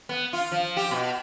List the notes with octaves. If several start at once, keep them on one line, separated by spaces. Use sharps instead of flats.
B3
F4
F3
G4
B2